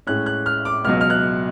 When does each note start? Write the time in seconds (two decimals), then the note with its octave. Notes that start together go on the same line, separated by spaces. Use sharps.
0.07 A2 G#3 C#4 F#6
0.26 F#6
0.46 F6
0.65 D6
0.84 C#2 B2 F#3 F6
1.01 F6
1.10 F#6